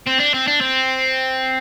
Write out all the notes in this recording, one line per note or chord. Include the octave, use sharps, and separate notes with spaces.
C4
D4
C4
D4
C4